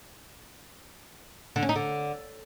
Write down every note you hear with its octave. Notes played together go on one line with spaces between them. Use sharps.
D3
C#4
D#4
D3